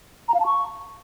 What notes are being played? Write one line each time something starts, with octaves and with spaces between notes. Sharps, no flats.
A#5
F5
A5
C#6